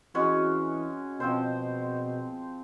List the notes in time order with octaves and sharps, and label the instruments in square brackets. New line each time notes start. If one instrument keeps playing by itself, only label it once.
[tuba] E3 [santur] G#3 C#4 F#4
[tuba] B2 [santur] F3 C4 C5